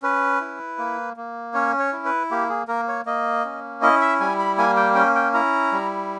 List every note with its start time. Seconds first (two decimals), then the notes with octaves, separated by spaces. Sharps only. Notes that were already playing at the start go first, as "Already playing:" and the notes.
0.03 C#4 B4
0.41 E4
0.78 A#3
1.17 A#3
1.54 C#4 C#5
1.79 C#5
1.92 E4
2.05 B4
2.31 A#3 G4
2.49 G#4
2.68 A#3 A#4
2.88 C#5
3.06 A#3 D#5
3.45 C#4
3.82 E4 D#5
4.01 E5
4.20 G3 G#5
4.39 B5
4.58 A#3 G#5
4.76 G5
4.95 C#4 G5
5.15 G5
5.34 E4 A#5
5.72 G3